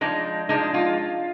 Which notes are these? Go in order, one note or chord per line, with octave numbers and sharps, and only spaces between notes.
F3 G#3 D4 D#4
F3 G#3 D4 D#4
F4